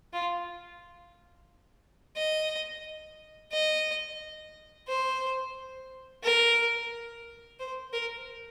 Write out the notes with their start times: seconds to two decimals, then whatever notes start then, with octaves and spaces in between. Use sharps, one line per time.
0.13 F4
2.16 D#5
3.52 D#5
4.88 C5
6.24 A#4
7.59 C5
7.93 A#4